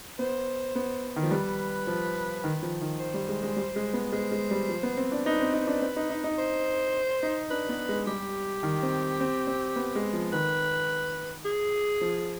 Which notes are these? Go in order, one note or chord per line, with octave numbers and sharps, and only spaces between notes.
B3 C5
B3
D#3
F3
G3 B4
F3
D#3
F3
D#3
C5
G3
G#3
G#3
G3
G#3
B3
G#3 C5
G#3
G3
F3
B3
C4
D4
D#4 B4
C4
D#4
D4
C4
D#4
D#4
D#4
C5
D#4
D4 B4
B3
G#3
G3 G4
D#3
C4
C4
C4
B3
G#3
F3
D#3 B4
G#4
F3